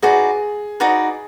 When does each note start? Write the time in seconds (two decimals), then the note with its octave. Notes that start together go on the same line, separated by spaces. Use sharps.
0.02 D#4 F#4 G#4 B4 D5
0.80 D#4 F#4 B4 D5